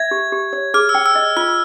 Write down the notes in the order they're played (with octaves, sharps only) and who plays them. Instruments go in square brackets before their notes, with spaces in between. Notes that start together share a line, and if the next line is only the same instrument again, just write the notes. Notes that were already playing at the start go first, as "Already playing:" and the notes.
Already playing: [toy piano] E5 [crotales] G#6
[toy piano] G4
G4
C#5
[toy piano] G#4 [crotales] F6
[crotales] E6
[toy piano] G5
[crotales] E6
[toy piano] D#5
[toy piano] F4 [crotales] F6